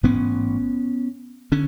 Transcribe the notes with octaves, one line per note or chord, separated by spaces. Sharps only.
A1 G#2 B3 C#4
D3 C#4